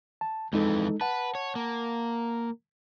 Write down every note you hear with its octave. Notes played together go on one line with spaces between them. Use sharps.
A5
F2 E3 G#3 D#4 A4
B4 F#5 A5
C#5
A#3